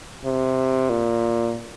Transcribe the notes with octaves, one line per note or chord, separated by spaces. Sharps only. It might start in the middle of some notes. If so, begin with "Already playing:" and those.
C3
A#2